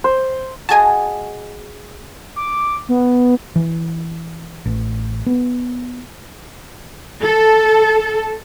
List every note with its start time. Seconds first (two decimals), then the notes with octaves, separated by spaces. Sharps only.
0.04 C5
0.69 F#4 G#4 D#5 G#5 A5
2.36 D6
2.89 B3
3.56 E3
4.66 A1
5.26 B3
7.21 A4